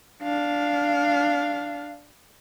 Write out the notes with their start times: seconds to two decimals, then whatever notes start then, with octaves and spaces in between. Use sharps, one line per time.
0.23 D4 F5